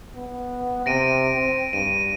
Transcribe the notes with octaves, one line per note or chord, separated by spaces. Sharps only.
B3
C3 A#6 D7 D#7
C4
G2 D#7